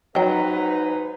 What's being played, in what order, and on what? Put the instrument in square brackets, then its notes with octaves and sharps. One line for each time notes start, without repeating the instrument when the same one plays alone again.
[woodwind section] G#2 D#4 B4 [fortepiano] F#3 [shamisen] D#5 G5